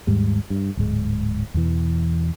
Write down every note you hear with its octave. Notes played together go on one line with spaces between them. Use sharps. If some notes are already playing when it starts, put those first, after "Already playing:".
D#2 G#2 G3
G2
D1 G#2 G#3
E2 B2 E3